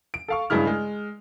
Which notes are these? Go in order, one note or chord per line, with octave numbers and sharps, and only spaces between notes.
D7
A4 F5 C#6
G2 C#3 G#3 E4 F6
G#3